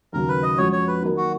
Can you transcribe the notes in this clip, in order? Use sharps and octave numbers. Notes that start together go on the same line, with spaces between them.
D#2 C#3 F#3 A#4
B4
D#5
F2 F3 G#3 C#4 F#4 C#5
C#5
B4
D#3 F#3 A#3 D#4
F#4